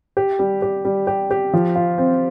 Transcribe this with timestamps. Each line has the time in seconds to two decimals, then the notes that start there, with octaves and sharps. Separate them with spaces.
0.17 G4
0.39 G3
0.62 G4
0.85 G3
1.07 G4
1.31 G4
1.53 F3
1.76 F4
1.98 C4